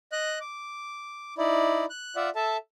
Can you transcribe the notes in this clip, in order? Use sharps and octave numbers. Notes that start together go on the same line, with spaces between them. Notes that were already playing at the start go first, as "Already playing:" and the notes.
D#5 F#6
D6
D#4 E4 D5
F#6
F4 D5 E5 F#5
A4 E5 A5